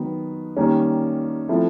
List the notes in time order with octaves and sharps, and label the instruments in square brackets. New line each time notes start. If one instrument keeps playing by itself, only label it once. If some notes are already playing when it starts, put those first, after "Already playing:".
Already playing: [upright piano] D#3 F#3 B3
D#3 G3 A#3 C#4
F3 A3 C4 E4